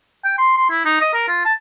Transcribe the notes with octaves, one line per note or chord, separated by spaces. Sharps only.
G5
C6
C6
E4
D#4
D#5
A#4
F4
A5